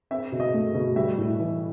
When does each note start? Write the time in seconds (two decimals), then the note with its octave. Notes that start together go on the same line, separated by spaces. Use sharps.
0.11 C4 E5
0.32 B2
0.40 D#5
0.54 A3
0.74 B2
0.96 G3 E5
1.18 A2
1.39 E3